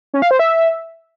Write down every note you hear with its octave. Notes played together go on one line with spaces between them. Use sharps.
C#4
F5
C5
E5